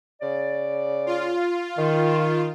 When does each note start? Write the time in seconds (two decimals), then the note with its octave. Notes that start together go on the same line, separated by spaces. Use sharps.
0.22 C#3 D5
1.06 F4
1.78 D#3